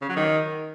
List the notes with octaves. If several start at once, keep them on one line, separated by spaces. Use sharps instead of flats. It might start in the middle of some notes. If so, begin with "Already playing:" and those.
C#3
F#3
D#3